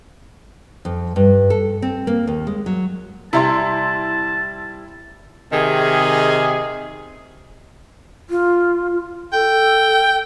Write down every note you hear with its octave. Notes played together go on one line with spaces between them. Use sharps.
F2
G2
A4
C4
A#3
D#2
G#3
F#3
C3 G3 E4 A5 C6
C3 D#3 G#4
F4
A4 G5